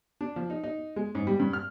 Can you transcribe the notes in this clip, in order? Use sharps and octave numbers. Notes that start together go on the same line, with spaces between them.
D4
F3
D#4
D#4
G#3
G#2
G3
G2
F6